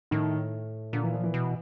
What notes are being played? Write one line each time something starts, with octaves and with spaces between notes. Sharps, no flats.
A2 D#3
A#2 D3
E3
F3
E3
B2